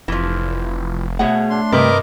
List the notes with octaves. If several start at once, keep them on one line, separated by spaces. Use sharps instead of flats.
F1 E3 F3
B2 A3 G#4 C#5 E5 F#5
D4 C6
G2 C3 A#4 B4 D#5 D6